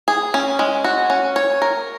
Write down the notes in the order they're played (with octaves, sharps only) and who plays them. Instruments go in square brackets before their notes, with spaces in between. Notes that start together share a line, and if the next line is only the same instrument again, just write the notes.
[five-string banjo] G#4
C#4
G#3
F#4
C#4
C#5
A#4